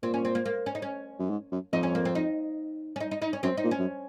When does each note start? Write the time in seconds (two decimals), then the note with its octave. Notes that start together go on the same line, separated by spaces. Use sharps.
0.03 A#2 C4
0.14 C#4
0.25 C4
0.35 A#3
0.45 A#3
0.66 C#4
0.75 D#4
0.82 C#4
1.19 F#2
1.30 G#2
1.52 F#2
1.73 F2 D#4
1.83 C#4
1.95 A#3
2.05 C4
2.15 D#4
2.96 C#4
3.00 D#4
3.11 D#4
3.22 D#4
3.33 C#4
3.43 F#2 C4
3.57 D#4
3.64 A#2
3.71 C#4
3.79 F#2